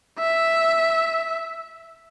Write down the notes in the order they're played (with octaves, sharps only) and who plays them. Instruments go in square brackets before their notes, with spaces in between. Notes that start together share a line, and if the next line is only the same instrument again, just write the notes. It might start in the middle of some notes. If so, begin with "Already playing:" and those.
[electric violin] E5